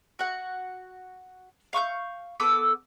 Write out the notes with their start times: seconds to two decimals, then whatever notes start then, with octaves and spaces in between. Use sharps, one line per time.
0.19 F#4 F#5
1.73 F5 C#6 D#6 G6
2.40 B3 A4 D6 E6